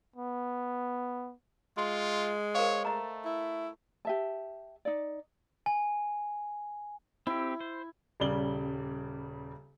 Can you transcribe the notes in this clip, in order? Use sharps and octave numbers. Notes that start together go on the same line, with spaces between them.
B3
G#3 F4 C6
A#4 C5 C#5 F5
A3 D#5 A#5
E4
G4 E5 A5
D#4 D5
G#5
C4 E4 G4
C5
D#1 C#3 G3 D5 F#7 G7